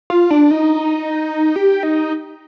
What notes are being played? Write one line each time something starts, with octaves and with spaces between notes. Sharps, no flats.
F4
D4
D#4
G4
D#4